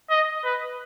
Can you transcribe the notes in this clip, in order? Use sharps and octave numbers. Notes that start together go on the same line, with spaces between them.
D#5
B4